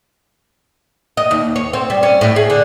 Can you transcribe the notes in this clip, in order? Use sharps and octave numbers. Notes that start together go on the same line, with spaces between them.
D#5
D#2
C#5
C4
G3
C#4
A2
G#4
D3